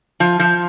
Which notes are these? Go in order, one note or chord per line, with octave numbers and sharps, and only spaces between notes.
F3
F3